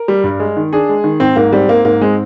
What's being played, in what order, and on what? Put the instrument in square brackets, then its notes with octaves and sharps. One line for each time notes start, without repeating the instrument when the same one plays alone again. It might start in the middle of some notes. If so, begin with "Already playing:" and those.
Already playing: [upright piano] A#4
[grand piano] G3
G2
G#3
D#3
[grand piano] D4 [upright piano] G#4
[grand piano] G#3
D#3
[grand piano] G#2 [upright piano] C4
[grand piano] G#2 [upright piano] A#3
[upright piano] G3 [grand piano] C4
[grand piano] G#2 [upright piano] A#3
[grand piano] G#2 [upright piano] A#3
[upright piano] G#3 [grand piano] C4